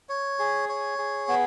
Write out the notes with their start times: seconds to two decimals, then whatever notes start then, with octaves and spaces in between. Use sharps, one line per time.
0.09 C#5
0.39 G#4
0.69 C#5
0.98 G#4
1.28 B3